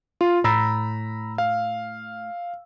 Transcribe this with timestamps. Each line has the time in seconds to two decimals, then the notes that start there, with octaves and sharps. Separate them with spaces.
0.21 F4
0.44 A2 A#5 B5 E6
1.38 F5